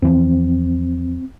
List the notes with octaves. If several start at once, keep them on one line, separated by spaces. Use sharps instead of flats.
E2 E3 F3 C4